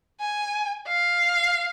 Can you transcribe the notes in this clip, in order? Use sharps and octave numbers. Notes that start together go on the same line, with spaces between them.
G#5
F5